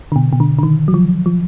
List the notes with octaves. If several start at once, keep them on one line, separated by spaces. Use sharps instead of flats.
D3
B2
B2
D3
D3
D#3
F#3
F3
F3